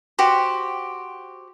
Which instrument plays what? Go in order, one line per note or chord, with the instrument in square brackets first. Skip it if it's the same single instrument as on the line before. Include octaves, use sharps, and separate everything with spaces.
[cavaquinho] F#4 G4 C5